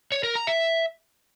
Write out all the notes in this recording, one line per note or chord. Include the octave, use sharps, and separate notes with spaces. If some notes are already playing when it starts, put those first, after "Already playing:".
C#5
A#4
A#5
E5